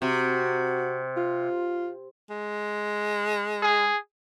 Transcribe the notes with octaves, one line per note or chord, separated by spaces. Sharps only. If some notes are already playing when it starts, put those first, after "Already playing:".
C3 F#4
F4
G#3
G#4